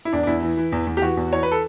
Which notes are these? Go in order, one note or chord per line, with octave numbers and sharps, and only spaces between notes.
E4
E2 D4
D4
E2 E4
E3
E3
E2
E2
G4
E3 F#4
E2
E3 C#5
B4
A4